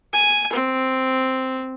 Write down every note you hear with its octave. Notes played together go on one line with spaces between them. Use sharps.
G#5
C4